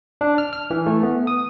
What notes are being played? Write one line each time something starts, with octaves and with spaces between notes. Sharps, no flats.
D4
F6
F6
E3
A3
B3
D#6